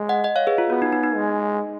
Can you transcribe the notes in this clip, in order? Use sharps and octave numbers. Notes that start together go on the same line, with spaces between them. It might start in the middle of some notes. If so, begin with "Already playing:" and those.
Already playing: G#3
D#5 F#5
D#5 F#5
C#5 F5
G#4 B4
F4
B3 F#4
D#4
D#4
D#4
G#3